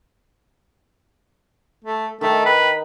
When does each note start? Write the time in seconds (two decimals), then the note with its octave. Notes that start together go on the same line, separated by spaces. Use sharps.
1.84 A3
2.21 D#3 A3 D#4 G5
2.46 B4